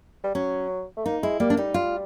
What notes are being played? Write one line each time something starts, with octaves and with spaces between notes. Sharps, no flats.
G3
F#3 C#4
A3
A#3 D#4
G#3 E4
G3 A#3
D4
G3 D#4
G3 F4